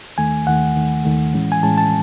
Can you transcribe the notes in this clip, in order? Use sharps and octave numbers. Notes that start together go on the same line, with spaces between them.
D#2 D#3 A3 G#5
D#2 D#3 A3 F#5
D#2 D#3 A3
D#2 D#3 A3
A2 E3 G#3 C#4
G#5
A2 E3 G#3 C#4 A5
A5